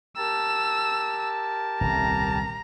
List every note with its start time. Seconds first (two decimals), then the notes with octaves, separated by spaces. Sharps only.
0.17 G4 A#4 A5 E6
1.81 D#1 C2 A#5